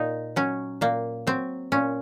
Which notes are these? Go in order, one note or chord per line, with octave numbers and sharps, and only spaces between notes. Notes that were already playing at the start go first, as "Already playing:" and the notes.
Already playing: A#2 D#4
F#3 C#4
A#2 A#3
F#3 C4
A#2 C#4